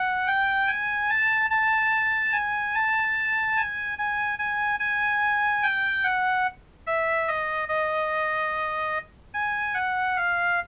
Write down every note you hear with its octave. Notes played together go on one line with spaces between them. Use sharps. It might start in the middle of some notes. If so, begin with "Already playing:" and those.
Already playing: F#5
G5
G#5
A5
A5
G#5
A5
G#5
G#5
G#5
G#5
G5
F#5
E5
D#5
D#5
G#5
F#5
F5